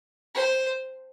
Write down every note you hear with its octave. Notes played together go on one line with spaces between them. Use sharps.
C5